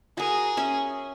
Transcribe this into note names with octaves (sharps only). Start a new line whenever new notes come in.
F#4 G#4 A#4
C#4 E5